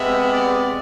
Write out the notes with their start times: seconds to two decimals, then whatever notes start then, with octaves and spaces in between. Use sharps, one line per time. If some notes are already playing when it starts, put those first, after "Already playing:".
Already playing: C3 G#3 B3 E5
0.31 D5